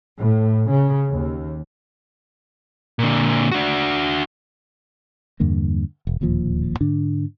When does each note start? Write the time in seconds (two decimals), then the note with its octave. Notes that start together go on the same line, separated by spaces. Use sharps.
0.19 A2
0.71 C#3
1.09 D#2
2.99 A#2 D3
3.52 D4 F#4
5.40 E2 G2 D3 A#3
6.07 E1
6.21 D1 D#2 A#2 F3
6.81 G#2 D3 D4